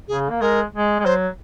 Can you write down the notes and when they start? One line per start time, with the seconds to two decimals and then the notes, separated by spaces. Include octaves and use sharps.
0.08 C#3 G#4
0.30 A#3
0.41 G#3 A#4
0.73 G#3
1.00 G#3
1.05 F#3 C5